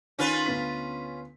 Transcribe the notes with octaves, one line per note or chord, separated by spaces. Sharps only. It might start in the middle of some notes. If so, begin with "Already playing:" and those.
D#3 C#4 F4 B4
D2 B3 B6